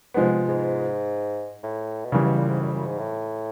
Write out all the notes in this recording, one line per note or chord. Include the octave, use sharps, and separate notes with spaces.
G#2 C3 F3 G#3 B3
G#2
A2
B2
A#2 C#3 E3 G3
B2
A#2
G#2
F#2
F2
F#2
G#2
A2